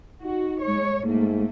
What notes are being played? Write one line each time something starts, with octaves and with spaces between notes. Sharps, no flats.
D#4 F#4
G#3 C#5
G#2 A3 A#3